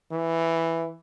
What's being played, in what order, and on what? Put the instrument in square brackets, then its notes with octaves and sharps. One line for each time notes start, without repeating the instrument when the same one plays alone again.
[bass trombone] E3